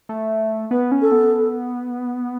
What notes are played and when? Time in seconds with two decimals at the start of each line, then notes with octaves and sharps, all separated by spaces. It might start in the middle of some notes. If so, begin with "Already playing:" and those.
0.09 A3
0.71 B3 B4
0.92 C#4
1.02 A4
1.12 B3